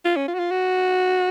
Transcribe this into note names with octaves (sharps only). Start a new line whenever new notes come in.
F4
C#4
F4
F#4
F4
F#4